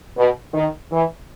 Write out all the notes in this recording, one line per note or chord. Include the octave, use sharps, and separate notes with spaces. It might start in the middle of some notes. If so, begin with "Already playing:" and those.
B2
D#3
E3